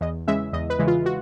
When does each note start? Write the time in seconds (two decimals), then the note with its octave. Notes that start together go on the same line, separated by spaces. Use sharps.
0.01 E2 D#5
0.27 C#3 E3 G#3 E5
0.53 E2 D#5
0.70 B4
0.79 C#3 E3 G#3
0.87 F4
1.06 F#4